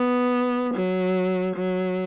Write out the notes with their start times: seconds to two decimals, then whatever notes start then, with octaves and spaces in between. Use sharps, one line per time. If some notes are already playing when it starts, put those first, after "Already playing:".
Already playing: B3
0.74 F#3
1.56 F#3